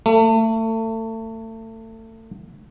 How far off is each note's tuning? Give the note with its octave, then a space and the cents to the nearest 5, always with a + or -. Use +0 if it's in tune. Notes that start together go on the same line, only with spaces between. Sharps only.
A3 +30